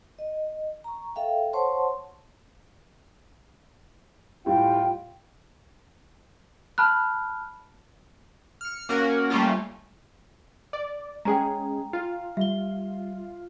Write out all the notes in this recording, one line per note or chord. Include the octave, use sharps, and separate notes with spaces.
D#5
A#5 C#6
A4 E5 F5 G5
C5 C#5 F#5 A5 C6 C#6
A2 G3 F4 G5
A5 B5 F6 F#6
F6 C#7
A#3 C#4 F#4 A#4
G3 A3 A#3 C#4 F4
D5
G#3 C#4 G#4 G5 G#5 A#5
F4 F5
G3 E5 G7